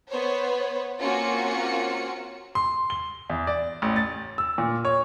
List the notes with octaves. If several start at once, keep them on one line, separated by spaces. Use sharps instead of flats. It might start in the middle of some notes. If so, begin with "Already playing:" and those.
B3 C5 C#5
A#3 C4 C#4 F4 F#4 C#7
C6
G7
E2
D5
A1
A6
E6
A#2
C#5